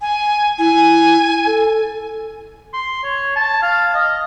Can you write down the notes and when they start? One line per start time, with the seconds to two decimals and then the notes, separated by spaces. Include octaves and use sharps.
0.01 G#5
0.58 E4 G#5
1.46 A4
2.73 C6
3.04 C#5
3.36 A5
3.62 F5
3.94 D#5